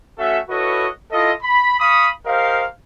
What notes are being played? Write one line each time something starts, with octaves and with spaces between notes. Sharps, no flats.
A3 C#4 F#4 A4 E5
E4 F#4 A4 B4 C#5 D#5
E4 F4 A4 D#5
B5
F5 B5 C#6 D#6
G4 A#4 C5 D#5 F5